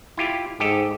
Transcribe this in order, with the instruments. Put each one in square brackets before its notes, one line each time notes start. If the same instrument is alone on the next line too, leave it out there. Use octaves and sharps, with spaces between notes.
[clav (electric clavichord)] E4 F4 G4
[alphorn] G#2 [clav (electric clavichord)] G4 A4 D#5